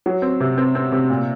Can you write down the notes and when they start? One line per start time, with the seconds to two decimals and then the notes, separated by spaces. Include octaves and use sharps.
0.06 F#3
0.22 C4
0.40 C3
0.58 C4
0.75 C4
0.92 C3
1.10 A#2